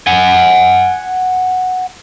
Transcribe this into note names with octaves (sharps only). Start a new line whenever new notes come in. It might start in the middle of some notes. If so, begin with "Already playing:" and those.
F#5 G#5